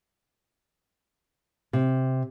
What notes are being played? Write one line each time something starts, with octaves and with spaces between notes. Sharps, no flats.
C3